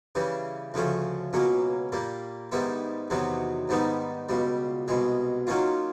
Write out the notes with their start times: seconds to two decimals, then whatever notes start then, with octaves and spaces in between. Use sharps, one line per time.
0.15 C#3 E3 G3
0.74 D2 C#3 F3 A3 C#4
1.33 C#2 B2 F#3 A#3 C#4
1.92 A#2 G3 A#3
2.52 G#2 D#3 G3 B3 E4
3.10 E2 C3 D#3 F#3 B3
3.69 G#2 D#3 G3 B3 D#4
4.29 C#2 B2 G3
4.88 C2 B2 G#3
5.47 D#3 F#3 A#3 C#4 F4